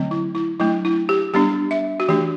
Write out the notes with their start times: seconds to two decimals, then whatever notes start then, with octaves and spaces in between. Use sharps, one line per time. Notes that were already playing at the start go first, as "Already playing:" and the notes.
Already playing: D3 F#3 A3 C4
0.11 E4
0.35 E4
0.60 F#3 A3 D4 E4
0.85 E4
1.09 G4
1.34 G3 B3 D4 G4
1.71 E5
2.00 F#4
2.08 E3 A3 D4 G4